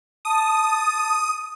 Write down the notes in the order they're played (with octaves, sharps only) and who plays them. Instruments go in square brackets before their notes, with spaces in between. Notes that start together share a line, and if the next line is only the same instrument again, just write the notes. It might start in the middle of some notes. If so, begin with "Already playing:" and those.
[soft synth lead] A5 [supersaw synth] D#6